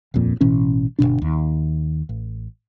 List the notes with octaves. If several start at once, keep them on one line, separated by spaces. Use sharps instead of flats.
D#1 A#1 F2 A#2
A1 B2 E3 C#4
G1 C2 B2 D4
D#2
A1